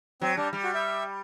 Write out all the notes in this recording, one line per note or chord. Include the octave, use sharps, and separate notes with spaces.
F#3 C4
G3 D4
G3
F#4
E5